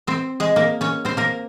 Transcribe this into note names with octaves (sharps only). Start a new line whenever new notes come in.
C4 C5
G#3 G#4
A#3 A#4
C#4 C#5
C4 C5
A#3 A#4